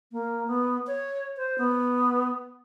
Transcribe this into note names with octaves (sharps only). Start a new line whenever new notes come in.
A#3
B3
C#5
C5
B3